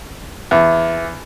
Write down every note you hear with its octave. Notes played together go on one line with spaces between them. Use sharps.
E2